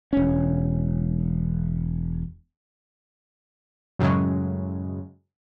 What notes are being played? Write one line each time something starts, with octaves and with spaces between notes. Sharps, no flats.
E1 C#4
F#2 A2 C#3 F#3 G#3